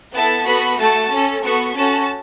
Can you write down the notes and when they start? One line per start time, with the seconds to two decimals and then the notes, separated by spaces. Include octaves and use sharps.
0.13 B3 E4 A4 A5
0.45 B3 F#4 A4 B5
0.78 A3 F#4 A4 A5
1.10 C#4 A4
1.43 B3 F#4 A4 C#6
1.75 C#4 F#4 A4 A5